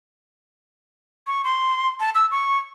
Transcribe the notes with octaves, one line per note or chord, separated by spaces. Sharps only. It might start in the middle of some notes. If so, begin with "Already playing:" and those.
C#6
C6
A5
E6
C#6